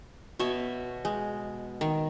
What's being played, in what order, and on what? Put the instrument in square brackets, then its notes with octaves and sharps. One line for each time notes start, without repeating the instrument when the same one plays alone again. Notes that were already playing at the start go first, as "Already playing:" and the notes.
[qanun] B2 C#5 E5
G#3
D#3